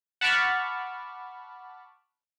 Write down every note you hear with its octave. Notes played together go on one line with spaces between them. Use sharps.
F#5 A5 B5 C#6 D6 F6